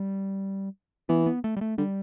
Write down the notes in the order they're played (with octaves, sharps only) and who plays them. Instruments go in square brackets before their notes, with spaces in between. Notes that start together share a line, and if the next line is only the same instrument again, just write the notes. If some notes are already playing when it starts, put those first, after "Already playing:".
Already playing: [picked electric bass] G3
[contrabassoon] E3 [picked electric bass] B3
[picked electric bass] B3
A3
G3
A3
[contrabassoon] D3 [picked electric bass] G3